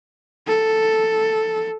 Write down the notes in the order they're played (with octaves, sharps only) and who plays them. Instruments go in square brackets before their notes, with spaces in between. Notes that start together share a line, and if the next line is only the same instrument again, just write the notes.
[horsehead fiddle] A4